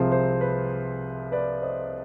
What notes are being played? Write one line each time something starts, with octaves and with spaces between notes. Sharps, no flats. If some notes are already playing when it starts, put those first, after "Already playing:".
Already playing: C2 C3 F3 G#3 C4 C5
C5
B4
B4 D5
C5 D#5